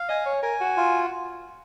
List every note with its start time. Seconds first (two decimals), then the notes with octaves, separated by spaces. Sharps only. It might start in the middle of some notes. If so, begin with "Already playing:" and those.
Already playing: F5
0.09 D#5 G#5
0.26 C#5
0.43 A#4 G#5
0.60 F#4
0.77 F4